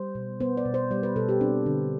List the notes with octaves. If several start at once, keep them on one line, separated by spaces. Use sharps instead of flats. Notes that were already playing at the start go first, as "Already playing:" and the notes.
Already playing: G3 C5
B2
B3 C5
D5
B2
C5
G3 D5
B4
B2 A4
G4
C4 D4
D3